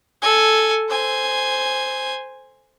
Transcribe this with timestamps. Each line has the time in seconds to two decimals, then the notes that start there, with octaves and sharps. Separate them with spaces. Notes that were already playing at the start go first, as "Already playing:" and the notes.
0.22 A4 G#5
0.89 C5 G#5